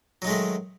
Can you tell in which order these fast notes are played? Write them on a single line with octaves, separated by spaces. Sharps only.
F#3 D#4 G#3 A3 D#3